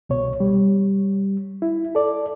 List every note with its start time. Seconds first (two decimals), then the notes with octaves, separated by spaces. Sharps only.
0.09 C2 B2 C#5
0.40 G3
1.62 E4
1.95 A4 D5